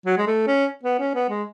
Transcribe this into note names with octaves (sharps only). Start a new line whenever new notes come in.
F#3
G#3
A3
C#4
B3
C#4
B3
G#3